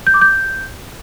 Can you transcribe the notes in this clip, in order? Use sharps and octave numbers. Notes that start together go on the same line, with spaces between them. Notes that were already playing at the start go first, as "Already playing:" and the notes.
G6
D6
G6